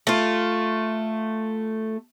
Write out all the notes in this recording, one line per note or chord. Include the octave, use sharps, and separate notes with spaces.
A3 F4